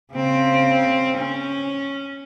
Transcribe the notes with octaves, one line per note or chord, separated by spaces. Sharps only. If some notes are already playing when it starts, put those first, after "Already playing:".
C#3 C4
C#4